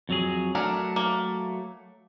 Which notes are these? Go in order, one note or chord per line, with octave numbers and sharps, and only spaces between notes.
F2 F#3 G#4
F#3 A3 D4 A#4
A#3